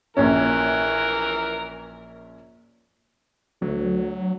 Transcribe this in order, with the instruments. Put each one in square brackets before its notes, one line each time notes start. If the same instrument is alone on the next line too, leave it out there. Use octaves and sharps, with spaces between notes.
[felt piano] A#1 C#4 [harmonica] E3 A#4
[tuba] D2 [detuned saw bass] F#3